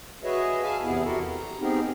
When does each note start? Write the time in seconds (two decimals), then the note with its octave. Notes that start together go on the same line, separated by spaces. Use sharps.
0.24 F#4 G#4 B4 C#5 D#5 E5
0.63 G#4 E5 F5 G#5 A5
0.83 E2 C3 B3 E4 G#4
1.04 E4 F#4 G4 A4 A#4
1.29 A#5
1.60 B3 C4 D#4 G4 G#4 A#4